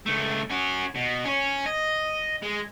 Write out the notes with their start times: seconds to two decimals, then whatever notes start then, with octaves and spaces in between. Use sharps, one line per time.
0.06 C#2 A3
0.50 C#4 F#4
0.95 B2
1.25 C#4 C#5
1.66 D#5
2.42 G#3